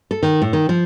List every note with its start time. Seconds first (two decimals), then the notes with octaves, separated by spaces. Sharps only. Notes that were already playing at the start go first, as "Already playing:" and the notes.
0.11 A4
0.23 D#3
0.42 A2
0.53 D#3
0.69 F3